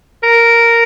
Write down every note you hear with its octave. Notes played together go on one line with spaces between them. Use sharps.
A#4